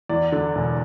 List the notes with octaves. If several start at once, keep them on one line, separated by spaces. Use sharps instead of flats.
E2 D5
D3
E1